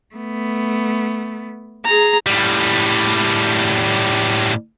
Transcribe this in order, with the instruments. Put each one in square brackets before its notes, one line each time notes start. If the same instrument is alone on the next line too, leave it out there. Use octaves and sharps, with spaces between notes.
[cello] A3 B3
[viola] G#4 A#5
[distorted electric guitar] A2 G3